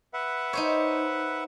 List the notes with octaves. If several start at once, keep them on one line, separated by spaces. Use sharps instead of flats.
B4 E5 F#5
D#4 C5 C#5